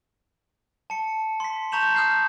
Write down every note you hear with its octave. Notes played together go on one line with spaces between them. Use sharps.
A5 C#7
C6 B6
A5 A#5 C#6 G6 E7 F#7
D#6 F6 G6 C7